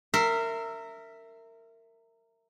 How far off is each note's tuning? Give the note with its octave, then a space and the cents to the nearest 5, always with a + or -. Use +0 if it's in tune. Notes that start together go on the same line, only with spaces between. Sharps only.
A#4 -25 E5 +0 C6 +5